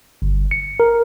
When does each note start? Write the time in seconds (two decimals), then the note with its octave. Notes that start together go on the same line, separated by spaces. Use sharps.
0.22 G1
0.51 C#7
0.80 A#4